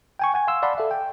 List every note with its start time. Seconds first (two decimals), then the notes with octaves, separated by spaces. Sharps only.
0.19 G5 G#5 C#6
0.34 F#5 G#5 G#6
0.47 F5 C6 E6
0.63 D5 F5 F#5 A5 B5 C6
0.78 A4 E5
0.91 G5